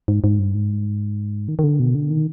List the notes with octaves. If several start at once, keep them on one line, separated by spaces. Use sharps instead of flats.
G#2
G#2
G2
G#2
D#3
D#3
D3
B2
D3
D#3